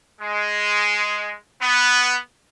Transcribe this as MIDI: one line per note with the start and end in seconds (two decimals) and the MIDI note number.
0.19 1.32 56
1.60 2.15 59